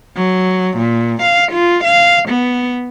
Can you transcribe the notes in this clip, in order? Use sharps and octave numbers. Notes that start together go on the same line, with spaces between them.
F#3
A#2
F5
F4
F5
B3